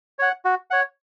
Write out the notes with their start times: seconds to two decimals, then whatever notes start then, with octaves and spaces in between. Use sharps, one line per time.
0.19 C#5 F#5
0.45 F#4
0.71 C#5 F#5